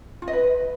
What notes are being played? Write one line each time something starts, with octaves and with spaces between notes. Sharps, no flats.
F4
D#5
B4